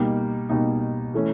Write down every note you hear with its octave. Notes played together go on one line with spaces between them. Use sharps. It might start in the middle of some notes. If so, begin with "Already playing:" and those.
Already playing: B2 G3 A#3 D#4
B2 G3 A#3 D#4
E3 A3 C#4